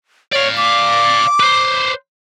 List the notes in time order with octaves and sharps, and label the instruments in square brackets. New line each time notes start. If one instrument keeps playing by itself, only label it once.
[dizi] C#5 [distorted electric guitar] D5 F5
[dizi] D6
[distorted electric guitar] B4 C5